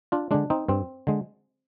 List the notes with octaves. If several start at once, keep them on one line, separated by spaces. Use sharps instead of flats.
D4 F4
D3 G#3 D4
C4 D#4
G2 C4
D3 G#3